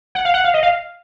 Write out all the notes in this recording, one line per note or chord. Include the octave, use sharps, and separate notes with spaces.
F#5
F5
F#5
F5
D#5
F5